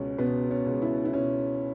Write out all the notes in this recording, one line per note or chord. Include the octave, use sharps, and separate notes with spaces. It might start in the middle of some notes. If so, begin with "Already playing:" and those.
Already playing: C#2 B2 C#4
B2 B3
C#4
C#2
E4
E4
B2 C#4